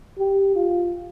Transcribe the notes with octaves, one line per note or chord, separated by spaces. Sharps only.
G4
F4